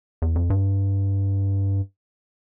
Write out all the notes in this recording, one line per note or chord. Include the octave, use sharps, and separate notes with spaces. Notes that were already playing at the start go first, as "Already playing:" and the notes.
E2
F2
G2